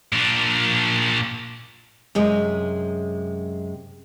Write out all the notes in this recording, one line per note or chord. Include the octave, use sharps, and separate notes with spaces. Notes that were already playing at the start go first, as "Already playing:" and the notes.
A#2 D4
F#2 C3 G#3